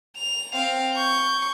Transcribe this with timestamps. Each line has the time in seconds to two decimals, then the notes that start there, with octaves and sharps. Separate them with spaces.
0.17 F7
0.55 C4 F5
0.95 C#6 G6